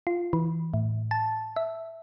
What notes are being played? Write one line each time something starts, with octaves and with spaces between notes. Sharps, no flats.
F4
E3
A2
A5
E5